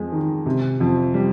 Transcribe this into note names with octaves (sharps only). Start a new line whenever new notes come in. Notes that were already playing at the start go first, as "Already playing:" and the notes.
Already playing: F2 G#3
D#3
C3
F2
G3